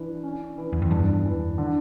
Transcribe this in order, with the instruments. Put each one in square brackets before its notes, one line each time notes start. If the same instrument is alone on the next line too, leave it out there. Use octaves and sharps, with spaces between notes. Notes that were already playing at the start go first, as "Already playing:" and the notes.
Already playing: [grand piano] E3 D4
C#4
E3
[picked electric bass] E2
F2
[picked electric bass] E2 G2 [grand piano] D4
[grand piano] E3
D3